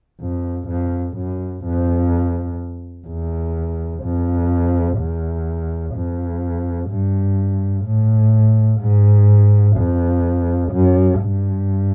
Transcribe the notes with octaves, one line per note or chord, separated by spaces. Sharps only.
F2
F2
F#2
F2
E2
F2
E2
F2
G2
A2
G#2
F2
F#2
G2